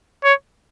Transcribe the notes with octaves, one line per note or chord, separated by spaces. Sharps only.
C#5